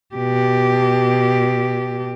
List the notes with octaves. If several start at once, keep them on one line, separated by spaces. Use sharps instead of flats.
B2 G4